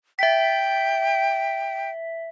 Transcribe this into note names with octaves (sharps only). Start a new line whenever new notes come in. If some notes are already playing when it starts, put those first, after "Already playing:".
E5 G5 B6